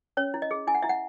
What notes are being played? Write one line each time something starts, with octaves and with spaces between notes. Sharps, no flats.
C#4 C#5
E4
D#5
G#4
E4 G#5
F#5
E4 E5
F#5